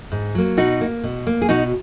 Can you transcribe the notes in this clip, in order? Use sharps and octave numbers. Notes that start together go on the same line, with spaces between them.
G#2
F#3 A#3
B2 D#4 F#4
A#3
B2
A#3
G#4
B2 D#4 F#4